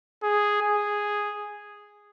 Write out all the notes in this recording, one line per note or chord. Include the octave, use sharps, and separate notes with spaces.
G#4
G#4